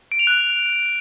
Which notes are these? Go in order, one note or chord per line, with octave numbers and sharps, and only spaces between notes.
D7
F7
F#6